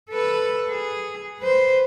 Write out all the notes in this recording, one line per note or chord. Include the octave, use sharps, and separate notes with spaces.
A4 B4
G#4
B4 C5